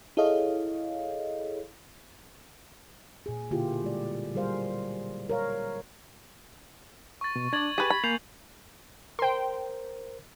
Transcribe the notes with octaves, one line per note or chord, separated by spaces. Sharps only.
E4 G#4 A4 C#5 D#5 F5
A#2 G#4
B2 D3 A#3 E4 F4 G4
G3 G#3 D5
F#3 G3 G#4 A#4 C5 F5
A#4 C#5 F5
C#6 A6
B2
D4 D5 G#6 A6 F#7
G4 G#4 B4
B5
A#3 G#5 C#6 G6 C7 F7
A#4 C5 G5 C6